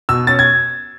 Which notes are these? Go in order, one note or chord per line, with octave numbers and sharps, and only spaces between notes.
B2 E6
C#4 A6
G#6